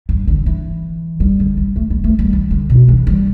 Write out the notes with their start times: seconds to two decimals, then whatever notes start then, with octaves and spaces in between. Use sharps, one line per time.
0.09 G2
0.28 D3
0.46 E3
1.20 G3
1.40 D3
1.57 G3
1.76 A3
1.90 G3
2.04 A3
2.19 G3
2.33 E3
2.51 D3
2.70 B2
2.88 E3
3.07 G3